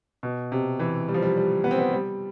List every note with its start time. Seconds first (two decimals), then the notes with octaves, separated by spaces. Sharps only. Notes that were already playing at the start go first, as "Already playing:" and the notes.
0.23 B2
0.52 C3
0.79 E3
1.08 G3
1.14 F3
1.22 G3
1.37 G3
1.64 B3
1.71 C4
1.79 B3
1.92 G3